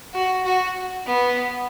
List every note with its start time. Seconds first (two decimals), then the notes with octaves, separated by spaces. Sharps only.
0.14 F#4
0.45 F#4
1.06 B3